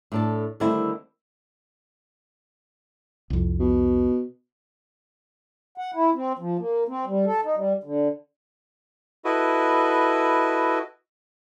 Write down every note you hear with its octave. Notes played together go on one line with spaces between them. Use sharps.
A2 D4 A4
D3 D#3 G3 A3 C4 E4
C2 F2
B2
F#5
E4
C4
F3
A#3
C4
G3
A4
D#4
G3
D3
E4 F#4 A4 B4 D#5